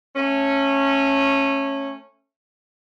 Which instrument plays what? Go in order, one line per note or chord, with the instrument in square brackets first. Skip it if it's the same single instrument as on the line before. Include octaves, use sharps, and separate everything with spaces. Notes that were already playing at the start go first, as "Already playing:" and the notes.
[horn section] A3 C#4